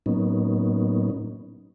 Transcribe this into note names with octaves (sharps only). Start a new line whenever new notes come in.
A2 F#3 A#3 B3 C#4 D#4